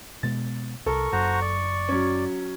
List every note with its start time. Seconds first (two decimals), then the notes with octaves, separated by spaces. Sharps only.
0.23 B2 G#3 B3 A6
0.86 C2 A4 A#4 C#6
1.12 F#1 F#2 F#4 C5 A#5
1.41 D5
1.89 F#3 C#4